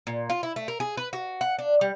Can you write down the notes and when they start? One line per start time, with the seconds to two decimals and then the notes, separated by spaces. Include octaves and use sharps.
0.07 A#2
0.30 F4
0.43 E4
0.56 A3
0.68 A#4
0.80 G#4
0.97 B4
1.13 F#4
1.41 F#5
1.59 D4
1.81 G3